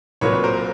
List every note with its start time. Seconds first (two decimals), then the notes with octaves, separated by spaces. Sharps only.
0.21 C2 A#2 F#3 A#3 B4 C#5
0.34 B4
0.44 A#4 C5